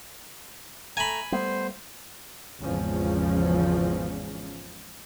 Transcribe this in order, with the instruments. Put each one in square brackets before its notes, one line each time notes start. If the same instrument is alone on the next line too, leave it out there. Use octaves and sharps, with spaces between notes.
[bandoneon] A3 A#5 [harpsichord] G#5 B5
[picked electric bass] G3 A3 B3 [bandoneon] C5
[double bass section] G#1 E2 C#3 F3 G#3 C#4